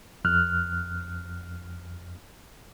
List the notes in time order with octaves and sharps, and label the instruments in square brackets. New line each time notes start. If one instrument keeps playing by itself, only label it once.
[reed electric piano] F2 F6 F#6